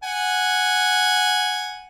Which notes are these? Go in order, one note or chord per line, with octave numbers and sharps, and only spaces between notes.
F#5 G#5